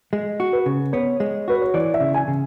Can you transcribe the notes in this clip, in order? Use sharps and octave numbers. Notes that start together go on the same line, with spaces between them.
G#3
F#4
B4
C#3
B3 C#5
G#3
F#4 B4
C#5
E3 D5
E5
C#3
G#5
C#3